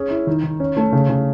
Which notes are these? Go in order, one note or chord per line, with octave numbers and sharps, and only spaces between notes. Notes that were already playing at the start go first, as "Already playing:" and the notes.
Already playing: C#4 G#4
E4
D#3
D#3
C#4
A3
C#3
C#3